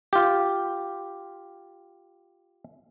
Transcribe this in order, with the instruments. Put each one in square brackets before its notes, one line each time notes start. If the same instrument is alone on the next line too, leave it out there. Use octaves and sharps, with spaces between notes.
[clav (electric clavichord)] F4 G4